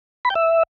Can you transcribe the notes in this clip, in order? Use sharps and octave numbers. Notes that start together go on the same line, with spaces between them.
B5
G5
E5